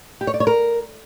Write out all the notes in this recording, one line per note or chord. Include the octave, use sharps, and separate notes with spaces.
G4
C#5
D5
C#5
A#4